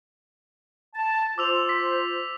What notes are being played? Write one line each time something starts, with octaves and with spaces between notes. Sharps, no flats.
A5
F4 C5 D6 E6 F7
B6